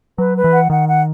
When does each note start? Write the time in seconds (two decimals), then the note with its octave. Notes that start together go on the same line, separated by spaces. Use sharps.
0.18 F#3 B4
0.35 B4
0.44 E3
0.53 F#5
0.70 D#3 F#5
0.88 F#5